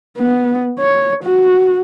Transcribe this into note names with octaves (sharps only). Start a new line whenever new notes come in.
B3
C#5
F#4